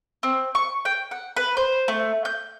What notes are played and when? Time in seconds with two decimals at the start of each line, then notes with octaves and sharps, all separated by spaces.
0.23 C4
0.55 C#6
0.85 G5
1.11 F#5
1.37 B4
1.57 C5
1.88 A3
2.25 G6